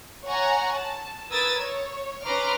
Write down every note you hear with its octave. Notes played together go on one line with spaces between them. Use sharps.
C#5 F#5 G#5 A#5
A5
A#4 B4 D#6 E6 G#6 A6
C#5
C#4 B4 A#5 C6 D6 F6